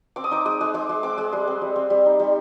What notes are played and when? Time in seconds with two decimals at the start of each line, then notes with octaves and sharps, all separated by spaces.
0.16 C4 D6
0.24 D#6
0.31 D#4 D6
0.45 G#3 D#6
0.61 G#3
0.74 G#3 D6
0.89 G#3
1.03 C4 D6
1.18 G#3
1.33 G3 C6
1.48 C4
1.62 G3
1.76 C4
1.90 G3
2.06 D#4
2.19 G3